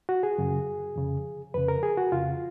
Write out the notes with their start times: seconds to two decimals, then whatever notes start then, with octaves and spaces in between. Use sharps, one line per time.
0.09 F#4
0.23 G#4
0.38 F#2 C#3
0.96 F2 C#3
1.54 F2 C#3 B4
1.68 A#4
1.83 G#4
1.97 F#4
2.12 F2 C#3 F4